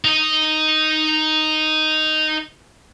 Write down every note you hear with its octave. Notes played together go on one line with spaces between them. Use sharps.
D#4 D#5